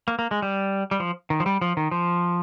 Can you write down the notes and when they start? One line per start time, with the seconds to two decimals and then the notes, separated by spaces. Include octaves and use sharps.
0.08 A#3
0.19 A#3
0.31 G#3
0.42 G3
0.91 G3
1.00 F3
1.30 D#3
1.40 F3
1.46 G3
1.61 F3
1.77 D#3
1.91 F3